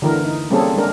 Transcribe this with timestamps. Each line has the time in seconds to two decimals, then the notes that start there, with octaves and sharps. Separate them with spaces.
0.02 D3 E3 A#4
0.25 D#4
0.50 G3 A#3 C4 C#4 G#4 A4
0.77 G#3 D4 A#4